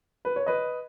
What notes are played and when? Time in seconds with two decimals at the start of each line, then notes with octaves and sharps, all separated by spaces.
0.25 B4
0.36 C#5
0.46 B4 D#5